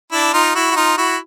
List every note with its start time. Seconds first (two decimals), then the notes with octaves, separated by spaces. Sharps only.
0.12 D4 E4
0.33 D#4 F4
0.55 E4 F#4
0.71 F#4
0.76 D#4 F4
0.98 E4 F#4